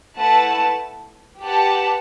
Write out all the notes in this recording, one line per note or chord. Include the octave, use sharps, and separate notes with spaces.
A3 E4 B4 F#5 A5
G4 B4 F#5 A5